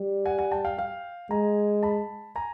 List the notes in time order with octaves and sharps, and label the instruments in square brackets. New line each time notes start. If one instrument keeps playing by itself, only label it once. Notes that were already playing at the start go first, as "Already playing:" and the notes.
Already playing: [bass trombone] G3
[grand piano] F#5 G#5
F#5 G#5
G5 A5
F5 G5
F5 G5
[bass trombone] G#3 [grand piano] G#5 A#5
[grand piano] A5 B5
G#5 A#5